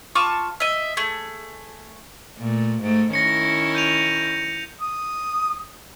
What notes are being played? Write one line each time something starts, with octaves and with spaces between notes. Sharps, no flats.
F4 A5 C#6 D6
D#5 E5
A3 G#4
A#2 A3
G#2 A3
D#3 C#4 E4 A#6 C#7
G6 D#7 F7
D#6